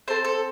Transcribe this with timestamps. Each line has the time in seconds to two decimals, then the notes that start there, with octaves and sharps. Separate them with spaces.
0.08 C4 A4 C5
0.24 A4